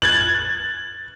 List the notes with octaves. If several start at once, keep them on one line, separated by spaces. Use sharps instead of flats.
F#6 G#6 A6 F#7